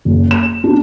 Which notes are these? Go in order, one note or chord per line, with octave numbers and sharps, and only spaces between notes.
F#1
E7
D4